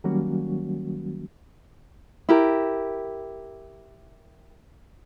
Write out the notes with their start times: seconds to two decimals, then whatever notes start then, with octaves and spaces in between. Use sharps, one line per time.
0.04 D#3 F#3 G3 A#3 C#4 F#4
2.29 E4 G4 A#4